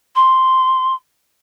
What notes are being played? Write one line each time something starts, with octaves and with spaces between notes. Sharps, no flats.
C6